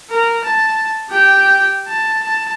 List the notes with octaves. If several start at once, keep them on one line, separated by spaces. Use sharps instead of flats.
A#4
A5
G4 G5
A5
A5